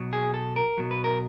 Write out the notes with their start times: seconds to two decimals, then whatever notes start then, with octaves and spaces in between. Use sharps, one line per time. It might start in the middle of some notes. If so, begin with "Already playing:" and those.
Already playing: B1 B2 F#3
0.13 G#4
0.34 A4
0.56 A#4
0.78 B1 B2 F#3
0.91 B4
1.04 A#4